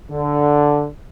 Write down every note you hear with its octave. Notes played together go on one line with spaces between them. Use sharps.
D3